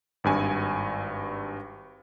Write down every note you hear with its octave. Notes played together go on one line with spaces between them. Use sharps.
G#1 G2 G#5